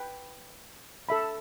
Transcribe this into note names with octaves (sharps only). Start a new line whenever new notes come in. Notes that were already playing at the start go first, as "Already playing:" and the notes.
Already playing: B4 G5
A4 E5 B5